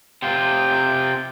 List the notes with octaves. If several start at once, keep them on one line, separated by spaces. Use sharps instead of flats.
C3 F4 G5